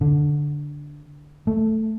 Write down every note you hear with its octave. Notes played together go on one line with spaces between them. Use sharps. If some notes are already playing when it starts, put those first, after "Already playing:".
D3
A3